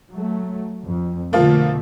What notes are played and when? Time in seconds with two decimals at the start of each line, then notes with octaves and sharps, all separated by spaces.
0.11 F#3 A3
0.86 F2
1.33 B2 D3 F3 A3 A#3 F4